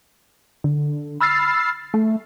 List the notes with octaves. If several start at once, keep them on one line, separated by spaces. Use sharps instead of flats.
D3
B5 E6 F6 A6 C7
A3